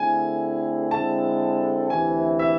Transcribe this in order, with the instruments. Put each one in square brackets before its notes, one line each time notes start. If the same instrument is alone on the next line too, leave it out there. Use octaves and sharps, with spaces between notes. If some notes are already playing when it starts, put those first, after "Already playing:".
Already playing: [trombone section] D3 A3 C4 E4 G#4 [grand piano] G#5
[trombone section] D3 G#3 C4 E4 A4 [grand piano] A5
[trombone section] D2 C3 E3 [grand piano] G#5
[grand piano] E5